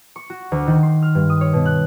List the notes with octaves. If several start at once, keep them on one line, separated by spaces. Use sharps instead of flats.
C#6
F#4
D2
D#3
C6
F6
G2
D#6
C#5
B2
F#6